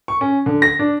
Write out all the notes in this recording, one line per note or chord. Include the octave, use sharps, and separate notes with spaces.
C#6
C#4
D3
A#6
D4